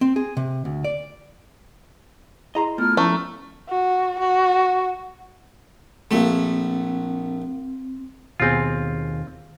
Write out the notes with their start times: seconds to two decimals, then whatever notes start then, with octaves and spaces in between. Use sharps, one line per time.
0.01 C4
0.16 G#4
0.37 C3
0.65 D2
0.84 D5
2.55 E4 G#4 D#5 A#5 C6
2.78 A2 B3 F4 F6
2.97 F3 A3 C#4 E4 A#5
3.69 F#4
4.19 F#4
6.11 A#1 A3 C4
8.40 D#2 B2 C4 F4 G#4